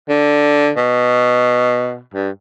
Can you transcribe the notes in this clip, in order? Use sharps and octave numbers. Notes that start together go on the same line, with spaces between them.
D3
B2
G2